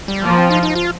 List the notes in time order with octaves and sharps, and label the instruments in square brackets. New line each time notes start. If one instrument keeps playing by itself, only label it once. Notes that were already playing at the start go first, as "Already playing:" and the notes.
[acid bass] G3
[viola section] F3 [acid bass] A#3
[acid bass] C4
D#4
D#4
F4